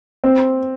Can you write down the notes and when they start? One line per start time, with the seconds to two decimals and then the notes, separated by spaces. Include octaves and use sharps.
0.24 C4